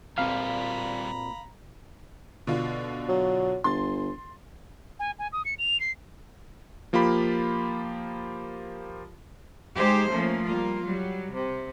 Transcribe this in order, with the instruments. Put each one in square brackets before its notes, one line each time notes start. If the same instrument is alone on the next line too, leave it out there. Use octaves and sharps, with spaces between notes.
[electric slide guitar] A#2 C4 [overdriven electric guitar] G3 F4 [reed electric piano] F5 [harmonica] A#5 B5
[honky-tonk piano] B2 D3 F4
[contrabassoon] F#3
[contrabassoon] G1 [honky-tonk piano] C6 A6
[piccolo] G#5
G#5
D#6
C#7
F7
C7
[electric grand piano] F3 A#3 F4 G4 B5
[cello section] G#3 D#4 G4 G#4 C5
F3 A3 A#3 C#4
G3 A#3 F4
F#3 G3
C3